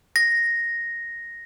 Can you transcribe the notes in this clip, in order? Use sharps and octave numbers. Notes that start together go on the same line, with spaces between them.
A#6